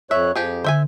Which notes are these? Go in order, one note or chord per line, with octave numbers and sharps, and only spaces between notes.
F2 C#5 E5 F#6
F2 F3 G4 G#4
D3 C5 E5 G#5